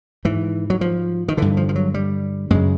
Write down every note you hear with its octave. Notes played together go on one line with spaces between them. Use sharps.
G#2 E3
F#3
F3
D#3
G2 D3 E3
F3
F3
F#3
G3
F#2 C#3 G#3